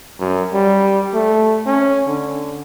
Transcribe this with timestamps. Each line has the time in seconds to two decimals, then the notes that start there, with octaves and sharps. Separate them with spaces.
0.20 F#2
0.53 G3
1.14 A3
1.66 C#4
2.07 D3